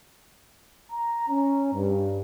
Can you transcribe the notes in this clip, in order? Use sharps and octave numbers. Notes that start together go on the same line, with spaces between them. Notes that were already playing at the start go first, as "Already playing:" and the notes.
A#5
C#4
G2